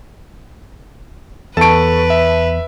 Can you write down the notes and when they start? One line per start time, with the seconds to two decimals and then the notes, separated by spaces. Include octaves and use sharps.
1.57 E2 A4 B4 A5 C#6 D7
2.10 E5